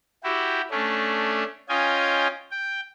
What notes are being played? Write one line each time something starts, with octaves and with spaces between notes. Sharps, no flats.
E4 F#4 G4
A3 C#4 D4
C#4 F4 D#5 G5 G#5
G5